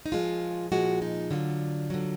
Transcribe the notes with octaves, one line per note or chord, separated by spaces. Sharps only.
D#4
A#2 F3 G#3 F4
A#2 F3 G#3 F#4
D#4
D3 F#3 F4
D3 F#3